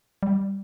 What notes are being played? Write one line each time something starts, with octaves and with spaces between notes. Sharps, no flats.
G3